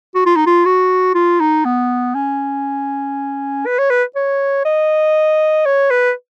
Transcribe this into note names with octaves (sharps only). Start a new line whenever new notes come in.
F#4
F4
D#4
F4
F#4
F4
D#4
B3
C#4
B4
C#5
B4
C#5
D#5
C#5
B4